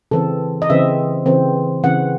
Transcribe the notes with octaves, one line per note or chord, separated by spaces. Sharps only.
C#3 E3 C4 A4
D#5
C#3 E3 C4 E5
C#3 E3 C4
C#3 E3 C4 F#5